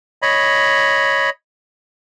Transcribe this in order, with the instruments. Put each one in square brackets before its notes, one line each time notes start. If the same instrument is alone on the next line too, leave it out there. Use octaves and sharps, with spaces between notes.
[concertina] C#5 D#5 B5